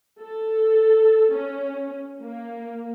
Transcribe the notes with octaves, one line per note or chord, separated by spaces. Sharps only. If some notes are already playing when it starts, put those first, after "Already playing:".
A4
C#4
A#3